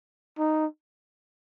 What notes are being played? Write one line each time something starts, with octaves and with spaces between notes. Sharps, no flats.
D#4